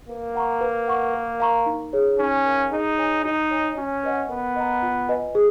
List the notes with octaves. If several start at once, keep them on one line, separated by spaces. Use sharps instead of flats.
A#3 B4
F#5 A#5 C#6
B4
F#5 C#6
A#4
F5 A#5 C#6
D#4
G#4 C#5
C#4 D#4
A#4 F5
D#4 G#4
C#5 G#5
D#4 F#4
C#5 G#5
C#4 F#4
B4 D#5 F#5
B3 A#4
D#5 A#5
F4
B4 D#5 G#5
G#4